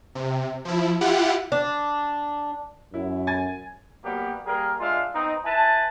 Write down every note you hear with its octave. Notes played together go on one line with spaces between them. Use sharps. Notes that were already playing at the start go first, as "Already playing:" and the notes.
C3
F3 E4
E4 F4 G4 F#5
D4
F#2 E4
G#5 G#6 A6
F#3 G3 A#3 B3 G4
G3 A#3 G#4 A#4
G#3 D4 F4 E5 F5
B3 C4 D#4
E4 B4 G#5 A5